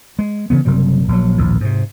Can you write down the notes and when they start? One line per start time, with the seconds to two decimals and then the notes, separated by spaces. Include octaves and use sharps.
0.19 G#3
0.50 C#3 E3 B3
0.65 F#1 C3 F#3 G3
1.08 A#1 F#3
1.38 A#1 D#2 A2
1.61 G#2 C3